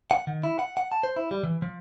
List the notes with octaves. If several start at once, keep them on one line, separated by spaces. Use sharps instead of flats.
F#5
D#3
E4
F#5
F#5
A5
C5
E4
G3
E3
F3